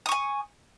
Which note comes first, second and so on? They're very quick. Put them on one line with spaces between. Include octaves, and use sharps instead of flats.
D#6 C#6 G#5